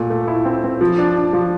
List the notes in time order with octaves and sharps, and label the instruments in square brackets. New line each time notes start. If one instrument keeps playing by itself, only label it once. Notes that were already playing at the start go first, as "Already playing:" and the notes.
Already playing: [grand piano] A#2 A3
A3
E4
C4
C4
F3
D4
D4
F3